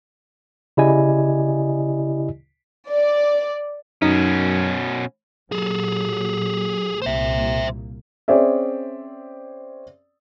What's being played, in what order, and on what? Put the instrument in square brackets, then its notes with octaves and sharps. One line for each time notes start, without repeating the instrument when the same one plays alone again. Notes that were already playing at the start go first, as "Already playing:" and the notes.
[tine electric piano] C#3 E4 G4 D5 D#5 G#5
[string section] D5
[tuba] F#2 [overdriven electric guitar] B2 C#4 [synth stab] D#4
[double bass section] A#2 F#3 [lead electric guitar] G#4 A4
[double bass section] C2 A#2 A#3 [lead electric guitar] C5 E5
[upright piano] C4 C#4 G#4 D5 E5